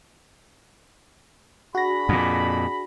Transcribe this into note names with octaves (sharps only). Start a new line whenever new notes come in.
D4 F#4 G#4 B5 A#6
F2 A#2